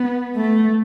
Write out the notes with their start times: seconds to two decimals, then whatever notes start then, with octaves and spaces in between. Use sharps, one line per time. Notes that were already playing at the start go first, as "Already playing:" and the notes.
Already playing: B3
0.36 A3